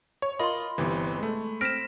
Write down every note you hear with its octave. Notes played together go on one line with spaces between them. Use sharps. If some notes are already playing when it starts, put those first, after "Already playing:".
C#5
F4 A#4 D#5 B5 C6
G1 C3 E3
G#3 A3
C4 F6 A#6 B6 D7 E7